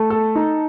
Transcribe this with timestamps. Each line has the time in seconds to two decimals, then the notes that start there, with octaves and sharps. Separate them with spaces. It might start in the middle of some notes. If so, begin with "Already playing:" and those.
Already playing: A3
0.10 A4
0.35 D#4